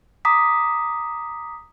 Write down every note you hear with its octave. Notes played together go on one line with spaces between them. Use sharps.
A#5 D6 D#6 B6